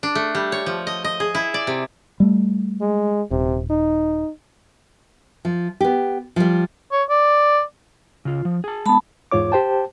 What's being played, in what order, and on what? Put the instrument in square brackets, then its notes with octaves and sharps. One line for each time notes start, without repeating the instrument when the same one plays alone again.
[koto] D4
A3
G3
C#5
F3
D#5
D#5
G#4
E4
D5
C3
[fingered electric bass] G3 A3
[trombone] G#3
[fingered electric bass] D#1 [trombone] C3
[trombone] D#4
[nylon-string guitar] F3
B3 G4
F3 G3
[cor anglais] C#5
D5
[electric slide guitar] C#3 F4
F3
G#4 A5
[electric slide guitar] G#3 B3 [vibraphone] A5 B5
[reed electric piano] E2 G#2 F4 C#5 D6
G4 C5 G5 A5